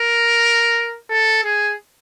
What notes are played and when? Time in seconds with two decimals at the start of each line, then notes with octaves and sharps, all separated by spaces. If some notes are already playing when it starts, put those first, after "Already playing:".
Already playing: A#4
1.10 A4
1.44 G#4